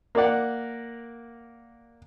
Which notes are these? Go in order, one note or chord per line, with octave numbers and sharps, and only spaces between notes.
A#3 A#4 D5 F#5